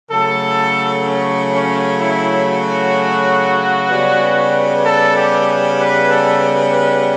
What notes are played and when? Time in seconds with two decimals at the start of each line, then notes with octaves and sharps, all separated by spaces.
0.11 C#3 F#3 A3 A4
1.06 C#4
1.54 C#4
2.00 E4
2.48 F#4
3.89 C#3 G3 B3
4.84 A4
5.16 G4
5.48 G4
5.79 B4
6.10 A4
6.73 B4